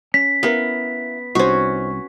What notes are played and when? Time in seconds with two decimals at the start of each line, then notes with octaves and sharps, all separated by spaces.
0.14 C#4 B6
0.43 B3 E4 A#4 F5
1.35 C2 C#4 D#4 F#4 C5